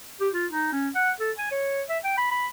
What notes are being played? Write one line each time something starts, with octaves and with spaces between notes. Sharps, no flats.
G4
F4
D#4
C#4
F#5
A4
G#5
C#5
E5
G5
B5
B5